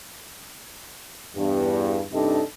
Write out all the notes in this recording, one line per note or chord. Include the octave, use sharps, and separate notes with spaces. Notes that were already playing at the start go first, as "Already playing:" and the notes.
E2 G2
G2 C3 D4 D#4 A4 D#5